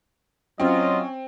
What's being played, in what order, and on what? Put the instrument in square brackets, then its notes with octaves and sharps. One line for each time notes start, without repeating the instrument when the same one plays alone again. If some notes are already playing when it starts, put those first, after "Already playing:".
[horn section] F#3 F4 [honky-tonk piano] C4 [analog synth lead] C#4 [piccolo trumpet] D#5